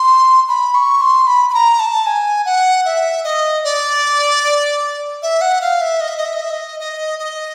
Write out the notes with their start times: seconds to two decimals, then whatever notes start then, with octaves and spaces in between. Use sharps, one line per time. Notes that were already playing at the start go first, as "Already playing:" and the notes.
Already playing: C6
0.48 B5
0.74 C#6
1.01 C6
1.27 B5
1.50 B5
1.54 A#5
1.79 A5
2.06 G#5
2.45 F#5
2.85 E5
3.24 D#5
3.64 D5
5.22 E5
5.41 F#5
5.61 F5
5.81 E5
6.01 D#5
6.08 E5
6.17 D#5
6.25 E5
6.34 D#5
6.42 E5
6.50 D#5
6.80 D#5
7.19 D#5